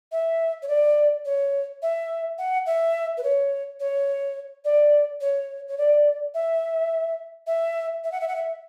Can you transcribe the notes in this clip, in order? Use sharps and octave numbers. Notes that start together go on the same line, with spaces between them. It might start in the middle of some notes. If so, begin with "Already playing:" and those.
E5
C#5
D5
C#5
E5
F#5
E5
B4
C#5
C#5
D5
C#5
C#5
D5
E5
E5
E5
F#5
E5
F#5
E5